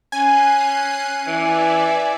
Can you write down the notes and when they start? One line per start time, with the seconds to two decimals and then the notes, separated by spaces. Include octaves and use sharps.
0.12 C#4 G#5 F#6 C7 D#7
1.27 E3 D5 E5